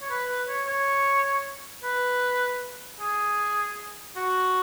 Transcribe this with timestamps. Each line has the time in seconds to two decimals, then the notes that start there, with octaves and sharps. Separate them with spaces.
0.02 C#5
0.10 B4
0.28 B4
0.48 C#5
0.67 C#5
1.84 B4
3.00 G#4
4.16 F#4